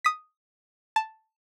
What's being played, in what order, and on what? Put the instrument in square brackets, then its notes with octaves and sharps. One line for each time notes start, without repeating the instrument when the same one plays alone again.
[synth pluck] D#6 B6
A5